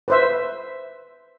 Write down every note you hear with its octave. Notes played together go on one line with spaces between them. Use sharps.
B4 C5 E5